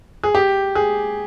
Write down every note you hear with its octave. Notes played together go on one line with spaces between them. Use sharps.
G#4
G4
G#4